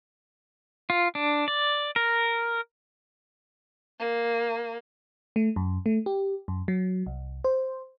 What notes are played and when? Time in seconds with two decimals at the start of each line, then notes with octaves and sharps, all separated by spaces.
0.90 F4
1.15 D4
1.48 D5
1.96 A#4
3.99 A#3
5.36 A3
5.56 F#2
5.86 A3
6.06 G4
6.48 F#2
6.68 F#3
7.07 C2
7.44 C5